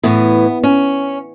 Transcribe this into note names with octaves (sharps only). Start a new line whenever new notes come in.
A2 E3 B3
C#4